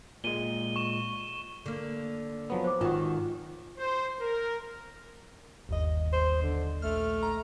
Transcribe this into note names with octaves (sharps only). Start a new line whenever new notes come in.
A#2 G#3 D#7 G7
C#6 E7
D3 A#3
F3 F#3 B3
C5 D6
G#1 D#3 F4 F#4
C5
A#4
G1 D#2 D#5
C5
D3
A#1 A3 F6
A#5